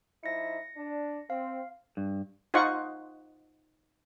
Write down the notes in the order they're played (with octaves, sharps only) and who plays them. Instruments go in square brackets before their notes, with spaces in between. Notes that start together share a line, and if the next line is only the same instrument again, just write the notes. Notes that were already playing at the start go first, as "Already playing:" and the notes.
[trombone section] F3 D#4 E4 [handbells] A#6 C#7
[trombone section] D4
[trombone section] C4 [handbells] F5
[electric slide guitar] G2
[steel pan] D#4 F4 C5 D#5 F#5 C#6